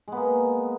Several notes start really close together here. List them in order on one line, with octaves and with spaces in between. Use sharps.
G#3 B3 A#3